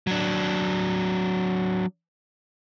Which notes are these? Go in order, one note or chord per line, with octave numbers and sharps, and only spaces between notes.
F#3 D4